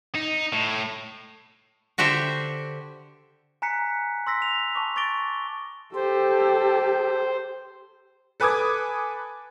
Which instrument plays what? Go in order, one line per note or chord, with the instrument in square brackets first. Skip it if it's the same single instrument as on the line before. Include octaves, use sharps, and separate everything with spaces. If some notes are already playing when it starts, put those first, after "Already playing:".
[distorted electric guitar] D#4
A2
[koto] D3 F#4 G4 C5 E5
[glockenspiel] G#5 A#5 F#6 B6 C#7
C6 E6 A#6 B6
F7
A5 C#6 D6
C#6 D6 A6 A#6 D7 G7
[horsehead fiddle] G4 A4 [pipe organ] C5
[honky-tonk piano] A4 B4 G#5 D6 D#6 G#6